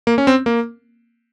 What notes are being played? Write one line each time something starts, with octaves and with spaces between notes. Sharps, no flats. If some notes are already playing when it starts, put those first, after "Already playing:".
A#3
C#4
C4
A#3